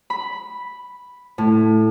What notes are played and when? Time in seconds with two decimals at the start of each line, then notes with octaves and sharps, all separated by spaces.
0.10 B5
1.38 A2